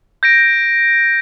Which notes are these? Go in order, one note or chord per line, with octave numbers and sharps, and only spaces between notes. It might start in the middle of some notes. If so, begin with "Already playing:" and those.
G6 A#6 D7